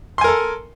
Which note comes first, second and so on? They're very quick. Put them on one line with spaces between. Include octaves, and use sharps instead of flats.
C6 G#5 A#4 A4